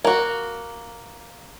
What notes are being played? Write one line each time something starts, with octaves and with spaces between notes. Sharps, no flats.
A#3 F#4